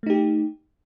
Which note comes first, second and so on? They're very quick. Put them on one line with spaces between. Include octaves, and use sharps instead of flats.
A3 D#4 G4